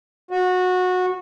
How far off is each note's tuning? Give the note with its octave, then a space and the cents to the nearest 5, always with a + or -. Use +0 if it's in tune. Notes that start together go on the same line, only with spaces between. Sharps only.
F#4 -20